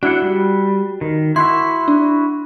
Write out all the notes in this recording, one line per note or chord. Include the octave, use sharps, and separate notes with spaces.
D4 E4 F#4 F#5
G3
D#3
E4 F#4 E5 C6
D4